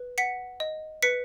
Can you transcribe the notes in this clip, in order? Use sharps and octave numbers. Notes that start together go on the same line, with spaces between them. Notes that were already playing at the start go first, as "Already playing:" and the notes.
Already playing: B4
F#5 B6 C#7
D#5
B4 B6 C#7